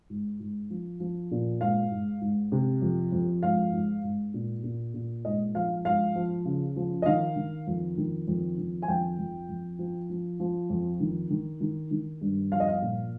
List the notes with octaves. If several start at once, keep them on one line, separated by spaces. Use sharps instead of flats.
G#2
G#2
F3
F3
A#2
G#2 F5
G#2
G#2
C3
F2
F2
G#2 F5
G#2
G#2
A#2
A#2
A#2
G#2 D#5
F3 F5
G#2 F5
F3
C#3
F3
D#5
D#3 F5
D#3
F2
D#3
F2
D#3
G#5
F2 G5
F2
F2
F3
F3
F3
F2
D#3
D#3
D#3
D#3
G2
F3 F5
D#5
F5
A#2